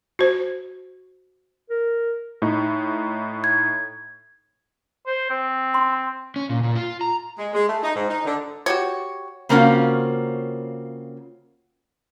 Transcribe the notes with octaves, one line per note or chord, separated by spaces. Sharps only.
F#4 C5
A#4
A2 D#4
G#6
C5
C4
C6
C#4
A#2
A#2
F4
A#5
G#3
G#3
A3
D#4
G#2
D#4
D3
F#4 G4 C#5
C#3 A#3 C4 C#4 F4 F#4